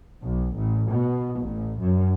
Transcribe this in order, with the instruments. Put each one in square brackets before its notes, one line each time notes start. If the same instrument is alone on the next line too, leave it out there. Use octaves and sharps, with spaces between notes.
[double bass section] B1
A1
B2
A1
F#2